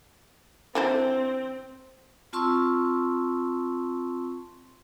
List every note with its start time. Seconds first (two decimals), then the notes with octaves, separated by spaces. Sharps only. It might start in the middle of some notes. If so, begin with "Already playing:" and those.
0.75 E3 C4 D4 C5
2.33 C4 F4 A5 C6 C#6 E6